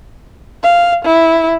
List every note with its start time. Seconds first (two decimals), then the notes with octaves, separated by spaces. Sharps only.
0.63 F5
1.05 E4